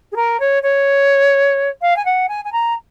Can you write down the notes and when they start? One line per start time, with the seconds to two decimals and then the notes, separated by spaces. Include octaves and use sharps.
0.12 G#4
0.16 A#4
0.40 C#5
0.63 C#5
1.82 F5
1.96 G#5
2.05 F#5
2.29 G#5
2.45 G#5
2.52 A#5